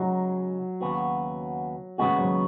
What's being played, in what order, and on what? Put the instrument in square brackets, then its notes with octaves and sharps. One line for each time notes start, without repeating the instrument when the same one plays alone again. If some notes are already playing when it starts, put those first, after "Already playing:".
Already playing: [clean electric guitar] C#3 G#3 D#4 F#4 [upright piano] F#3
[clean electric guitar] D#2 C#3 B3 F#4
[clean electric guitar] D#2 C#3 B3 F#4 [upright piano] G#3
[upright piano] F#3